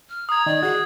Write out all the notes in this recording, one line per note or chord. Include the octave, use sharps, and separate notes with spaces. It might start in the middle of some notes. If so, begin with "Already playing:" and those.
F6
A#5 D#6 G#6
D#3 D5
F#4 G#4